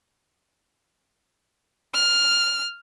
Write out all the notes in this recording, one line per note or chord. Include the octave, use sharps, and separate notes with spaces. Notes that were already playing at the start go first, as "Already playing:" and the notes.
F6